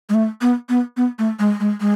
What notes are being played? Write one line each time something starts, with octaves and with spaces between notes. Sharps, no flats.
G#3
A3
B3
B3
B3
A3
G#3
G#3
G#3